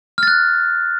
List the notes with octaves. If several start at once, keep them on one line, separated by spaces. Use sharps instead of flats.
F6 F#6 A6